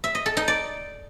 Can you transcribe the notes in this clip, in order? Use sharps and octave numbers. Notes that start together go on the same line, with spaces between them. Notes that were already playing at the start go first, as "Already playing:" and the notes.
E5
D#5
A4
D#4
D5